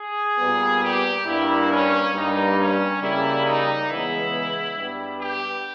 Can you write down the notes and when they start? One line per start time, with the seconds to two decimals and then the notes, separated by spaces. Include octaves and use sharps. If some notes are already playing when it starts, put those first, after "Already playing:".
Already playing: G#4
0.37 A#2 G3 B3
0.81 G4
1.25 G2 G3 A#3 E4
1.69 C#4
2.13 G2 G3 A#3 D#4
2.56 C#4
3.00 C#3 G3 A#3 E4
3.44 D#4
3.87 E2 C#3 G#3 B3 E4
4.75 G2 G3 B3
5.19 G4